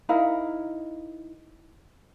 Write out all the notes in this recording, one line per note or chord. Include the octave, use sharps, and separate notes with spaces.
D#4 E4 A#4 F5